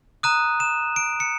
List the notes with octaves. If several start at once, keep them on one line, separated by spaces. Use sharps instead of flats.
A#5 D#6 F#6 D#7
E7
D7
C#7